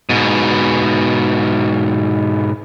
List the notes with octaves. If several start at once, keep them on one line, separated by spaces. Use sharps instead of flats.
G#2 B2